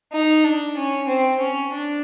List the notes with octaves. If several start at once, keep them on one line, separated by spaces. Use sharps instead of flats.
D#4
D4
C#4
C4
C#4
D4